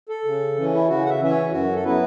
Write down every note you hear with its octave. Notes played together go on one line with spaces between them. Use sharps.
A4
C#3
E3 C#4
E4
C#3 F#4
F#5
E5
E3 C#4 E5
C#5
F#2 F#4
A4
F#3 B3 E4 B4